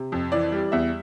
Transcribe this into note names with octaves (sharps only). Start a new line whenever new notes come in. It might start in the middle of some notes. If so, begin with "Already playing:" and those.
Already playing: C3
F2
E3 D5
G3
E2 E5